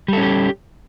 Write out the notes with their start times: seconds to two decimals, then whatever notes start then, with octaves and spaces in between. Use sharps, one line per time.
0.08 G3
0.13 A4
0.18 C#4
0.22 G4